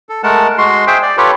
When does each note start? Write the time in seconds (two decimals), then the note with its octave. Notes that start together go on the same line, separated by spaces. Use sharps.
0.09 A4
0.23 G#3 A3 A#4 F#5 A5
0.58 G#3 F#4 C6
0.87 G#4 C5 E5 G5
1.03 D5
1.17 F4 G4 A4 B4 C#5